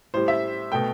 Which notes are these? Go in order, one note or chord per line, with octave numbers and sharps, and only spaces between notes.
A2 G3 C5
E5
B2 A3 G5